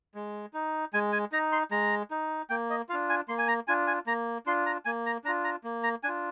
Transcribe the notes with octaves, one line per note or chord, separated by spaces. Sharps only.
G#3
D#4
G#3 G#5
G#5
D#4 A#5
C6
G#3 A#5
D#4
A#3 G5
D#5
D4 F4 F5
G#5
A#3 C6
G#5
A#5
D4 F4 G#5
G#5
A#3 A#5
D4 F4 C6
A#5
A#3 G#5
A#5
D4 F4 A#5
A#5
A#3
A#5
D4 F4 G#5